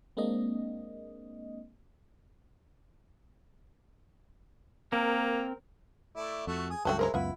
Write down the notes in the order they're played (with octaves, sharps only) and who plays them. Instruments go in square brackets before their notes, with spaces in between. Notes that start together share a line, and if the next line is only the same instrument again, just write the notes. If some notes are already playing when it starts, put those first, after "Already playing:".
[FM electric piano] G#3 A#3 C4 D4 D#5
[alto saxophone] A#3 [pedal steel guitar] C4 A#4
[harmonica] A3 E4 D5
[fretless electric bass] F2 [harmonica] A3 F#4 A4
[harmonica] G#4 D#6
[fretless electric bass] C#2 G2 F#3 [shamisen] A3 G5 A5 [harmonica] F#4
[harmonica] G#3 E4 [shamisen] A#4 C5 A#5
[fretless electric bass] C#2 F#2 B3 [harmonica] E4 B5 [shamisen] F4 F#5